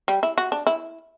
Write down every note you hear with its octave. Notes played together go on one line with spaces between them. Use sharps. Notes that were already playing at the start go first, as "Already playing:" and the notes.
G3
E4
F#4
D4
E4